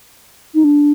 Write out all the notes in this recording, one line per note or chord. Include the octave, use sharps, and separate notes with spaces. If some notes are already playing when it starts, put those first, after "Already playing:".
D#4
D4